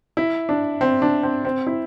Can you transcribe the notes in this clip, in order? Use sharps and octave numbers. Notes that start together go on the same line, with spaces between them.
E4
D4
C4
D4
C4
C4
E4